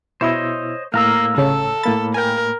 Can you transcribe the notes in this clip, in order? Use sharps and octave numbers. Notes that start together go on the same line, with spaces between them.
B2 E4 C5 C#5 D#5 E6
A2 A#3 F5 A#5 E6
G1 C#3 A4 C#5
A2 A#3 B5 A6
A#4 G5 G#5